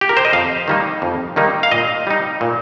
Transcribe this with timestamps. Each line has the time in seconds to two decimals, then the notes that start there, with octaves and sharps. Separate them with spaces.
0.01 G4
0.09 A#4
0.17 C5
0.25 D#5
0.33 F2 F5
0.68 D#3 G3 A#3 D#4
1.02 F2
1.36 D#3 G3 A#3 D#4
1.63 F5
1.71 A#2 D#5
2.07 G3 D#4
2.41 A#2